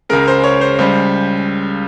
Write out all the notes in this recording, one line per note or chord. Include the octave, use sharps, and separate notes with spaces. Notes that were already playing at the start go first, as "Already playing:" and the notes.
C#2 C#3 G#3 A#4
C5
C#5
C5
C#2 C#3 G3 C5